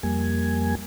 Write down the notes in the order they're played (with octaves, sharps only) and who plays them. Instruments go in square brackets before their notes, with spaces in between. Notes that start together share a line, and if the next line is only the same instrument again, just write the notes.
[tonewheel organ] F2 G3 A#3 G#5